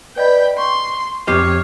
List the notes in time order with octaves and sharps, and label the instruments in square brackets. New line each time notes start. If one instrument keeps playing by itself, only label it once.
[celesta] B4 D5 D#5 [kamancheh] G5 B5
[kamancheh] C6 [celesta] C#6
[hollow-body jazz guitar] F2 G4 D#5 [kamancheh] C#5 [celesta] F6 C7